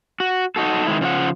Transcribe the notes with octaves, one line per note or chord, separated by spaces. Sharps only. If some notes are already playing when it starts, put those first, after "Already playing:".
F#4
D#4 F#4 A4
D#3 G#3 E4
C#3 F3 D5 F#5